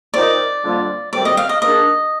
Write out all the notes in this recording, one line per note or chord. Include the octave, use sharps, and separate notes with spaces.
F3 C4 D#4 A#4 D5 D#5
F2 D3 G3 A#3 F4
D2 C3 D#3 G3 C4 D5
D#5
F5
D#5
D#3 A#3 D4 G#4 D#5